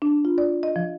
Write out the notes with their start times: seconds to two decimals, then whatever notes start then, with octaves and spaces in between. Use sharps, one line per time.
0.02 D4
0.25 F4
0.38 D5
0.63 D#5
0.76 F3